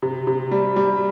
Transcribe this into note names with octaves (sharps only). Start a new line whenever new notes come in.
C3
C3
G3
G3